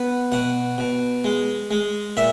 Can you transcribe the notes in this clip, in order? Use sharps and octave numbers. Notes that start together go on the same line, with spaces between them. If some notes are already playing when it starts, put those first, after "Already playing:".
Already playing: B3
B2 F#5
B2
G#3
G#3
A#2 E5